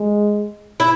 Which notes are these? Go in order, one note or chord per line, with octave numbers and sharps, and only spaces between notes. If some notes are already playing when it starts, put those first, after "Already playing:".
Already playing: G#3
E4